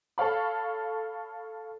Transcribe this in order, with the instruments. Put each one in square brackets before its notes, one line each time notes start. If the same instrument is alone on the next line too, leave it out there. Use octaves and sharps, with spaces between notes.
[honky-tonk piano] A4 C#5 F5 B5